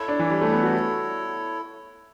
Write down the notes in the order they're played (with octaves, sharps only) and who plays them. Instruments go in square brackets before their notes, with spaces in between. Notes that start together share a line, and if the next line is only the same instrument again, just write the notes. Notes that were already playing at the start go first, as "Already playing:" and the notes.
Already playing: [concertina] E4 A4 C#5
[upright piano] D4
E3
G3
A3
B3
F#4